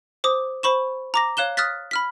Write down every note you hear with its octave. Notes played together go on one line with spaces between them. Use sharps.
C5 D6 D#6
C5 B5 C#6 E7
A#5 D6 A#6
C#5 F5 F#6 E7 G7
D#6 F6 F#6 A6 B6
B5 F6 B6